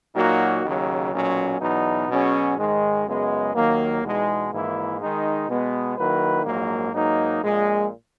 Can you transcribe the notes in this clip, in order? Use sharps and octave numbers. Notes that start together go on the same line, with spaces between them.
A#2 F#3 A#3 D#4 F#4
D#2 C#3 F#3
B1 A#2 F#3 C#4
E2 B2 F#3 B3 D#4
B2 F#3 C#4 G#4
G#2 D#3 G#3
F#2 C#3 G#3 B3
D#2 D#3 F#3 A#3
E2 B2 G#3 D#4
G#1 G#2 E3 A#3 E4
D#3 G#3 D#4
B2 G#3 B3
D#3 F#3 A#3 E4 B4
A#1 G#2 F#3 A#3
G#2 F#3 A#3 D#4
A#1 A#2 G#3